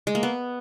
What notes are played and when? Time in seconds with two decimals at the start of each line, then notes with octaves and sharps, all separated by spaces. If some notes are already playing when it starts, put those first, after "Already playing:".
0.07 G#3
0.15 A#3
0.23 B3